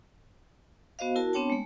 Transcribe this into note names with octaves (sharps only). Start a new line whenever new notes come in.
B3 F#4 C5 D#5 F5
E4 F#4 A#4 A5
B3 C4 D4 C#5 G5 A5
G#3 A3